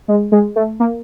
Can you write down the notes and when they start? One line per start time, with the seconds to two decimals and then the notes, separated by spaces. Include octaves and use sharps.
0.08 G#3
0.32 G#3
0.56 A3
0.80 A#3